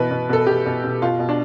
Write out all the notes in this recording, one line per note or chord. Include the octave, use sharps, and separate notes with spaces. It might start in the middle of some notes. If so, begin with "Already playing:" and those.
Already playing: B2 E3 B4
B2
B2 A4
B2 G4
B2
B2
B2 F4
B2
D4